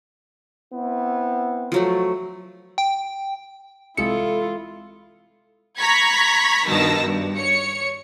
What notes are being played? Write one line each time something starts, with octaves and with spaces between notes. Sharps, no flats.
B3 C4 E4
F3 F#3 A3
G5
C2 E3 G#3 E4 F4 A4 F5 C#7
A#5 B5 C#6 G#6 B6
G2 B2 D#3 A5 E6 A#6
G2
C#5 C#7